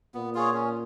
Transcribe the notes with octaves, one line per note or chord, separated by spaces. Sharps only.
A#2 B3
F4 G#4 C#5
C#4